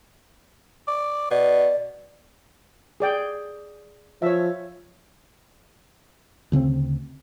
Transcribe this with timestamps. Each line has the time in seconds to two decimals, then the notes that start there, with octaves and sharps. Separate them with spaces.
0.87 D5
1.31 B2 D5
3.00 G#4 D5 G5
4.22 F3 C#5 E5
6.52 D2 C#3 B3 C4